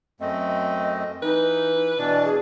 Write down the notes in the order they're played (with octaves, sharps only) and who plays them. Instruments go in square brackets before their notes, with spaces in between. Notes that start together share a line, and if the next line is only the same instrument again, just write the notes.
[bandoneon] F#2 A3 C4 [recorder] D#5
[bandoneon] E3 [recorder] D#4 [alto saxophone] B4
[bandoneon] B2 E3 D4 [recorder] D5
[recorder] G#4